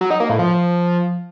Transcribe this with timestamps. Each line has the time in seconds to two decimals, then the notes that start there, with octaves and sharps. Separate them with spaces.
0.01 F#3
0.11 D#4
0.20 A#3
0.30 A2
0.39 F3